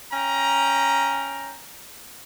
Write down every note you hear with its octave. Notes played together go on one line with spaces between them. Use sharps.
C#4 G5 A#5